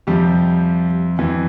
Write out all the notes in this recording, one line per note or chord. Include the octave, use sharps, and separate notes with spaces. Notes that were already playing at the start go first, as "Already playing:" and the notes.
F2 C3 F3 G3 G4
F2 E3